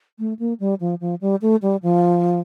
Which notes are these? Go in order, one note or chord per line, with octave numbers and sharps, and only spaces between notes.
A3
A#3
G3
F3
F3
G3
A3
G3
F3